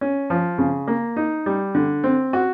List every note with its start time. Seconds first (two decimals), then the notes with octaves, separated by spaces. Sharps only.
0.01 C#4
0.30 F3
0.58 C#3
0.88 A#3
1.17 D#4
1.46 G3
1.75 D3
2.04 C4
2.33 F#4